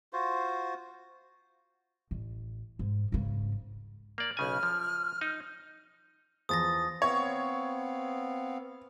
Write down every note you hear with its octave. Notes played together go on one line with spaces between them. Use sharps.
F4 F#4 C5
A1
G#2
G#2 C#3
A#3 D5
B1 C#3 G#5 F6
F3
D#4
E2 F3 D#6 A6 A#6
B3 C4 C#5 F5